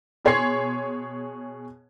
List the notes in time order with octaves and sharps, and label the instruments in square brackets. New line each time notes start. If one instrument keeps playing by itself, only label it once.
[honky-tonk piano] B2 G#4 C#5 C6 G#6 C7